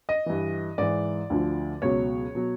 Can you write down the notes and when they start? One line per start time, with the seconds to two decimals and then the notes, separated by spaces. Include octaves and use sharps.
0.09 D#5
0.26 G2 E3
0.78 G#2 E3 D5
1.30 D2 D3 F3
1.82 C#2 B2 F#3 C#5
2.35 B2 F#3